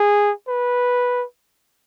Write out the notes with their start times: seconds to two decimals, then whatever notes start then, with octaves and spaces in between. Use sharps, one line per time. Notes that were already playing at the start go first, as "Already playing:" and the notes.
Already playing: G#4
0.48 B4